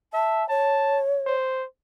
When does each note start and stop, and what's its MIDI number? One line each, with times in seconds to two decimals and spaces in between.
0.13 0.44 76
0.13 0.49 81
0.49 1.33 73
0.49 1.00 81
1.27 1.66 72